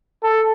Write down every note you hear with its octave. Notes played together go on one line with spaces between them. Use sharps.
A4